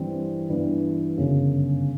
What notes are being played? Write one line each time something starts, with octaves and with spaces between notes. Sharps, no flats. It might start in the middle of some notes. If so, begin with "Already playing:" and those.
Already playing: G2 E3 G3 C4
G2 E3 G3 B3 D4
G1 F#2 C#3